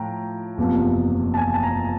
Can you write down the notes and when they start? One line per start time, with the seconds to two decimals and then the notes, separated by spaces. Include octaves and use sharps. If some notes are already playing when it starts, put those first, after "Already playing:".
Already playing: A2 F3 G5 A#5
0.58 F#1 E2 C3 F3
1.34 A5
1.37 G#5
1.54 A5
1.63 A#5